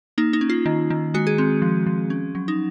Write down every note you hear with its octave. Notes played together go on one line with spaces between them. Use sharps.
A#3 D#4
D#4
C#4
F4
D#3
D#3
G#3 F#4
G#4
C4
F3
F3
C#4
F#3
D#4